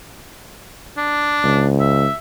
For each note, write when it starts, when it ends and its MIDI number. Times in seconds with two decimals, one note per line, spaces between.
0.97 1.67 62
1.44 2.06 37
1.80 2.16 76